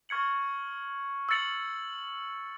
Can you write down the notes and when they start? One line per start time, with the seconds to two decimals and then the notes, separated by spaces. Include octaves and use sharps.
0.09 C#6 F6 G#6 C#7 F#7
1.29 E6 A6 C#7 F#7